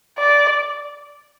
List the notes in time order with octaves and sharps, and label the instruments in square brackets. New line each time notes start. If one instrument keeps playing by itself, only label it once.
[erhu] D5